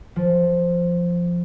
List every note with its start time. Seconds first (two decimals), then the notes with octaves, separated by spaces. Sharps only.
0.16 F3